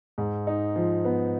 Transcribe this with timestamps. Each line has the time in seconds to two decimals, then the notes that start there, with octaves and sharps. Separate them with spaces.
0.18 G#2
0.47 D#4
0.76 F3
1.05 B3